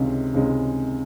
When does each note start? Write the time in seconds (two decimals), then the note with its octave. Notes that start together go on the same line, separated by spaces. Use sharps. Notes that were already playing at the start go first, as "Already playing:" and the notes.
Already playing: C#2 C3 D#3 G#3 C#4
0.34 C#2 C3 D#3 G#3 C#4